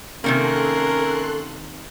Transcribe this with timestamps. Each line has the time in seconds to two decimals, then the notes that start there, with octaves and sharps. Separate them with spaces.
0.24 C3 D#3 A#3 C#4 A4 A#4 C6 F#6